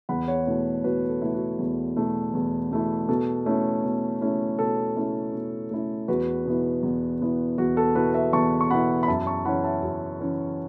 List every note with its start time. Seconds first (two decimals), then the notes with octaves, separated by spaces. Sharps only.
0.09 E2 F#5 B5
0.28 C#5 F#5
0.47 B2 A3 E4
0.84 E2 F#4 B4
1.09 A4
1.22 B2 A3 E4
1.34 F#4
1.59 E2
1.96 B2 A3 E4
2.34 E2
2.72 B2 A3 E4
3.09 B2 A4
3.46 A3 C#4 E4
3.83 B2
4.21 A3 C#4 E4
4.58 B2 A4
4.96 A3 C#4 E4
5.33 B2
5.71 A3 C#4 E4
6.08 E2 F#4 B4
6.46 B2 B3 E4
6.83 E2
7.21 B2 B3 E4
7.58 E2 F#4
7.77 A4
7.95 B2 B3 E4 F#4 B4
8.14 B4 E5
8.33 E2 A5 C#6
8.61 C#6
8.70 B2 B3 E4 F#5 B5
9.03 B5
9.08 F#2 E5 A5
9.27 A5 C#6
9.45 E3 C#4 F#5 B5
9.64 E5 A5
9.83 F#2
10.20 E3 C#4